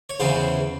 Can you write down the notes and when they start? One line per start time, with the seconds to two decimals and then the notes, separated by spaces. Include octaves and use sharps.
0.10 C#5
0.20 E2 C#3 E3 C5